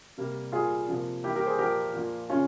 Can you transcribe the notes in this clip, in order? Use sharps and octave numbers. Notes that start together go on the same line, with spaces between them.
C3 G3 A#3
A#2 G3 A#3 F4 G#4
C3 F3 A#3
E3 G3 A#3 E4 G4
G4 A#4
G#4 C5
A#2 F3 A#3 G4 A#4
A#2 F3 A#3
C#3 C#4 F4